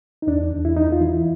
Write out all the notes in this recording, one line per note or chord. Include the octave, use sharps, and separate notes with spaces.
D#4
E2 D4
E2
E4
E2 D#4
F4
E3 E4